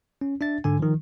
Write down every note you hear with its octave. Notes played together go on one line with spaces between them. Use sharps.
C#4
D4 E5 A6
G#2 D3 G#5
D#3 F3